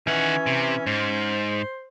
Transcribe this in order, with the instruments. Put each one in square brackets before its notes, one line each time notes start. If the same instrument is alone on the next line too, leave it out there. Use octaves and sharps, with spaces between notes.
[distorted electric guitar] D#3 F#5 [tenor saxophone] E3 [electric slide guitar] C#4
[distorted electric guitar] C3
[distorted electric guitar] G#2 [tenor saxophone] C5